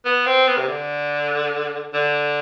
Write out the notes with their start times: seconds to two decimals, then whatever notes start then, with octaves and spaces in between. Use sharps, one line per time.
0.05 B3
0.26 C4
0.47 B3
0.58 C3
0.68 D3
1.93 D3